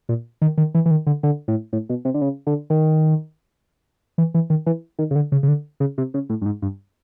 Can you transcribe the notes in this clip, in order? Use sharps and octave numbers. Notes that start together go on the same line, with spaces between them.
A#2
D#3
D#3
E3
E3
D#3
D3
D3
A2
A2
B2
C3
D3
C#3
D3
D#3
E3
E3
D#3
E3
D#3
C#3
D3
C#3
C#3
D3
C#3
C3
C#3
A2
G2
G#2
G2